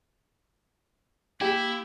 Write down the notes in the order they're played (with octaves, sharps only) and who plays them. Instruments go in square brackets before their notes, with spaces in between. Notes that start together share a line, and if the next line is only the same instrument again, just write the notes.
[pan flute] A#3 [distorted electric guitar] E4 [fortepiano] G4